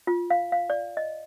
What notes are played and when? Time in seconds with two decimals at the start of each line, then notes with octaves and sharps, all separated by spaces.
0.07 F4
0.30 F5
0.52 F5
0.70 D5
0.97 D#5